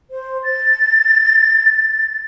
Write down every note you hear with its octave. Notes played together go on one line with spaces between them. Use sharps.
C5
A6